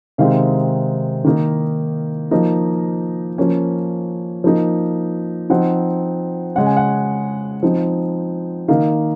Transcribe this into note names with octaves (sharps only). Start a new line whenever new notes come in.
C3 D#3 G#3 C4 D#4 F5
D#3 A#3 D#4
F3 A#3 D#4 D#5
F3 A#3 C#4
F3 A#3 D#4
F3 C4 D#4 F#5
C#3 G#3 C#4 F#5
G#5
F#5
F3 C4 D#4
D#3 A#3 D#4 F5